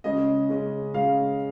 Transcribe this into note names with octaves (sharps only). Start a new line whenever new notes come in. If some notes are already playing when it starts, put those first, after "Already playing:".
C#3 G#3 C#4 D#5
C#3 G#3 C#4
C#3 G#3 C#4 F5